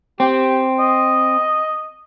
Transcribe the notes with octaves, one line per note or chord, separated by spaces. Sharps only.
C4 G4
D#5